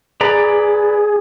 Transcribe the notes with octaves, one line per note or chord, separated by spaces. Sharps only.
G#4 B4 D5 A#5